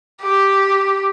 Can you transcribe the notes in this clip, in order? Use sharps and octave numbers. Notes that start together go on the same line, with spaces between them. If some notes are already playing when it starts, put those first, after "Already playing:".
G4